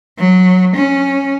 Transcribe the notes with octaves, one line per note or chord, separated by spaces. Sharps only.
F#3
C#4